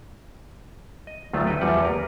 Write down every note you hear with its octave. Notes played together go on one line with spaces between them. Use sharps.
D#5
D2 D#3 F#3 A3 B3 F4
D#4 E4 G4 B4 G5
E2 F3 G3 F#5
A#3 A#4 B4